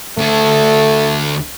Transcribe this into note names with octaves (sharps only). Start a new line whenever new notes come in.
D2 A3 A4